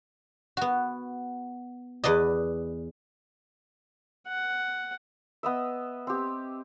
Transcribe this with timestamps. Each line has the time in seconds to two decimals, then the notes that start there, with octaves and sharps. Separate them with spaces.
0.57 B3 F#4
2.04 E2 B4 D5 D#5
4.28 F#5
5.43 B3 D#5 E5
6.07 C4 G4